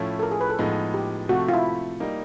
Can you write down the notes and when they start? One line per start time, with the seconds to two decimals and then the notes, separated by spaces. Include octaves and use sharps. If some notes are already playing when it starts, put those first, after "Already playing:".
Already playing: A2 F3 A3 C#4 E4
0.19 A4
0.23 A#4
0.31 G#4
0.41 B4
0.50 A4
0.58 A2 F3 G#3 B3 D#4
0.94 G4
1.29 C3 F3 A3 F#4
1.49 F4
1.53 E4
2.00 G3 A#3 D#4